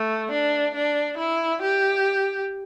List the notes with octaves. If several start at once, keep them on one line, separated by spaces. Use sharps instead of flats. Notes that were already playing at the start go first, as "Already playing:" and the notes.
Already playing: A3
D4
D4
E4
G4